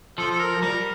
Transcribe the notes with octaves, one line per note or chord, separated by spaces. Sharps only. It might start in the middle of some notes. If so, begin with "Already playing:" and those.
F3 A4
A4
A#4
G3 A#4